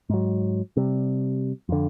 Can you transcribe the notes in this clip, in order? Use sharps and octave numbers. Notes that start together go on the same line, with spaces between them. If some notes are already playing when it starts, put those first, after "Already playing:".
G#2 F#3
C3 G3
F2 D3